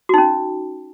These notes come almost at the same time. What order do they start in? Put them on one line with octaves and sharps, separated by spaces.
F#4 D#4 C#4